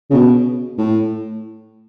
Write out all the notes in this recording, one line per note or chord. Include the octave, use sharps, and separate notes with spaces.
C#3
B2
A2